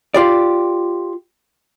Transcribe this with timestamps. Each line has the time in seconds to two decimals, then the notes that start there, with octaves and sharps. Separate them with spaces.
0.14 F4 G4 D5